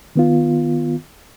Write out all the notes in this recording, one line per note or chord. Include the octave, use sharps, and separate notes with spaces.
D#3 B3 F4